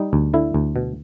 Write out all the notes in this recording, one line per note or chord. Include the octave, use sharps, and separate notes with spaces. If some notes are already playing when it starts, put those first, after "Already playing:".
Already playing: G3 D#4
D2
D3 E4
D2
B2